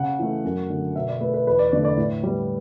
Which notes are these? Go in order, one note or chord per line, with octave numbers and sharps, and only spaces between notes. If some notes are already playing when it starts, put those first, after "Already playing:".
Already playing: C#3 F#5
E3 A3
F#2
D3 A3
B2 E5
D5
A3 B4
B4
E2 B4
D5
D3 A3 D5
D5
A2
G3 B3